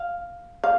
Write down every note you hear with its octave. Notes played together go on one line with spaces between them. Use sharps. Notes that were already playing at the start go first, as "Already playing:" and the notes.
Already playing: F5
F5